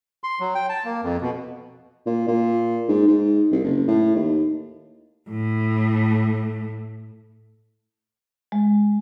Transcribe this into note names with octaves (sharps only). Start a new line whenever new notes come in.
C6
F#3
G5
A5
A#3
F2
B2
A#2
A#2
G#2
G#2
C2
F#1
A2
D#2
A2 A3
G#3